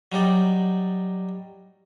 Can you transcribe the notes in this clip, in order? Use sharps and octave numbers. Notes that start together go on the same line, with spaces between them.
F#3 G3 D#4 D5